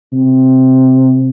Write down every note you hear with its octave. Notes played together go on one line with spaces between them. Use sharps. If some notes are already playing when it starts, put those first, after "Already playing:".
C3